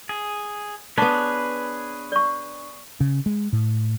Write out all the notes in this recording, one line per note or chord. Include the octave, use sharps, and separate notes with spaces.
G#4
B3 D4 G#4 B4 C#5
D5 C#6
C#3
G#3
A2